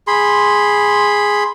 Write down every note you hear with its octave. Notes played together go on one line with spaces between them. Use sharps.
G#4 B5 C6